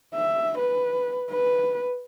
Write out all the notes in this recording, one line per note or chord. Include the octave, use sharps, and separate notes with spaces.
E5
B4
B4